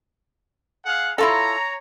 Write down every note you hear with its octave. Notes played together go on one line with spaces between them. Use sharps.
G#4 F5 F#5
E4 F4 A4 C#5 A#5